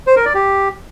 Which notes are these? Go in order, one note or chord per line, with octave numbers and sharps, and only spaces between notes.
C5
A#4
D5
G4